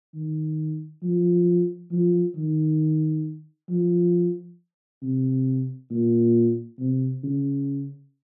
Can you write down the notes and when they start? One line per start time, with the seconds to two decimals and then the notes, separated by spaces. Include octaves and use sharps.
0.14 D#3
1.03 F3
1.92 F3
2.36 D#3
3.69 F3
5.02 C3
5.90 A#2
6.79 C3
7.23 C#3